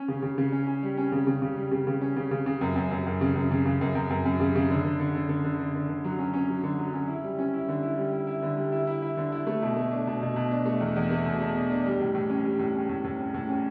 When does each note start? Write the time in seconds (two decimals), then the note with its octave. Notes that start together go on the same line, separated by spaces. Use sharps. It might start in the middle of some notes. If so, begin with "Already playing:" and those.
Already playing: C#4
0.08 C#3
0.23 C#3
0.38 C#3
0.52 C#4
0.67 C#4
0.83 G3
0.97 C#4
1.12 C#3
1.27 C#3
1.42 C#3
1.57 G3
1.71 C#3
1.87 C#3
2.01 C#4
2.16 C#3
2.31 C#3
2.46 C#3
2.61 F#2
2.76 F#2
2.91 F#2
3.06 F#2
3.21 C#3
3.36 F#2
3.51 C#3
3.66 C#3
3.81 F#2
3.95 F#2
4.10 F#2
4.25 F#2
4.40 C#3
4.56 C#3
4.70 D3
4.85 D3
5.00 D3
5.15 D3
5.29 D3
5.44 D3
5.59 D3
5.75 D3
5.89 D3
6.04 F#3
6.18 C#4
6.34 C#4
6.49 F#3
6.64 D3
6.79 F#3
6.93 C#4
7.08 E4
7.24 G3
7.39 C#4
7.54 E4
7.69 D3
7.83 E4
7.97 G3
8.13 E4
8.27 E4
8.42 D3
8.57 G3
8.72 E4
8.87 E4
9.02 E4
9.17 D3
9.32 E4
9.47 A3
9.62 B2
9.77 A3
9.91 D4
10.07 B2
10.21 B2
10.36 B2
10.51 D4
10.65 A3
10.80 E2
10.96 E2
11.10 A3
11.26 B2
11.40 B2
11.55 D4
11.71 D4
11.86 G3
12.00 A2
12.15 A2
12.30 C#4
12.45 G3
12.59 A2
12.75 C#4
12.89 A2
13.04 A2
13.19 C#4
13.34 A2
13.49 C#4